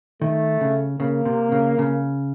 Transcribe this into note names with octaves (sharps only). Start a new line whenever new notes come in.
D#3 A3
C#3
C#3 A#3
C3
C#3
C#3